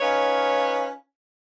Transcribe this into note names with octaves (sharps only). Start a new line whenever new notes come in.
C#4 D#4 F4 B4 C#5